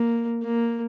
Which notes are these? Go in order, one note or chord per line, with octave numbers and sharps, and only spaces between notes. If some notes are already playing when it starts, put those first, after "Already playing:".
Already playing: A#3
A#3